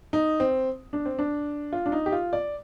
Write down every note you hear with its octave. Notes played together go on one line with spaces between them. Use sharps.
D#4
C4
D4
C4
D4
F4
D4
D#4
G4
F4
D5